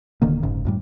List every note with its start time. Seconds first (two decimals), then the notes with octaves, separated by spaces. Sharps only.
0.22 D1 D3 D#3 A#3
0.43 F1 G#2 C#3
0.65 F#2 A2 G3